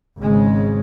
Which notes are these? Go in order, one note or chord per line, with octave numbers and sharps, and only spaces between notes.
G#1 C#3 G#3